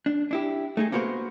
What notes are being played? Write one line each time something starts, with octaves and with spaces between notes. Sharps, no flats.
D4
D4 E4 G4
A3 D#4 G#4
A#3 B3 F#4 A#4 C5